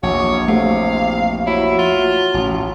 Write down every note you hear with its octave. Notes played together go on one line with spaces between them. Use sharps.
A#1 E2 F#4 C#5
C3 A3 F5
F#3 E4
F4
A1